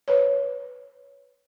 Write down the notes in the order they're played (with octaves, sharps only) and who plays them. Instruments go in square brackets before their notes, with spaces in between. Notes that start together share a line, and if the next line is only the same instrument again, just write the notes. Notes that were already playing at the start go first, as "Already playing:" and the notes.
[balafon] B4 C#5